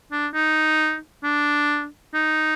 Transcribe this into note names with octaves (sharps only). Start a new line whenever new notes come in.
D4
D#4
D4
D#4